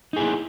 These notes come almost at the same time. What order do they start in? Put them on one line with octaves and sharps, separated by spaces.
D#4 G#4 E4